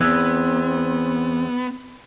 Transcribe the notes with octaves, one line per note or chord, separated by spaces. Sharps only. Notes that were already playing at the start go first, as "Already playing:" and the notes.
E2 B3 C4 E6 F#6 G#6